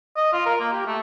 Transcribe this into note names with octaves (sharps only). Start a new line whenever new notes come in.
D#5
F4
A#4
A#3
G4
A3